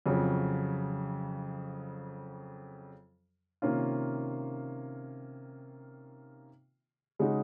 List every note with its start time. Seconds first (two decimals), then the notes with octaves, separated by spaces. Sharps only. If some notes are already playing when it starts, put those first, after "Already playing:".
0.06 F2 C#3 F#3
3.62 C3 D#3 A#3 C#4 F4
7.19 C#3 G#3 D#4 F#4